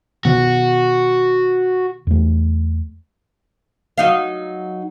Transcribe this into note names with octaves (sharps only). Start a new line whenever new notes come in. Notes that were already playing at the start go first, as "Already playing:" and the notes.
B2 D#3 B3 F#4
E2 A3
F#3 D#4 F5